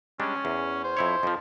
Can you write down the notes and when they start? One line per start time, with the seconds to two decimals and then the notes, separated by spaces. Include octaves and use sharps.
0.20 G3 G#3 C#4 D4
0.45 E2
0.84 C5
0.97 F2 E4 C#5
1.23 F2 F3